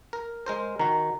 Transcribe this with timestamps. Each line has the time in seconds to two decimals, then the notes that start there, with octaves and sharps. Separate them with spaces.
0.13 A#4
0.46 G#3 A#4 C5
0.79 D#3 F#4 A#5